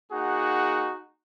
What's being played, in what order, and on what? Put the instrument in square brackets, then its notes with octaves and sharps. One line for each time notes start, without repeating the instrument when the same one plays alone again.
[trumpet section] A#3 D#4 F#4 G#4 F#5